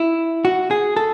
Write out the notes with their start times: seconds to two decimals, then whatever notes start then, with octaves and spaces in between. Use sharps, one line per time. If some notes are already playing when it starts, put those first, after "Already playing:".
Already playing: E4
0.45 F#4
0.71 G#4
0.96 A4